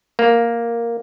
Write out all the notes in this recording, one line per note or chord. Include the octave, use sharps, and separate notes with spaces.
A#3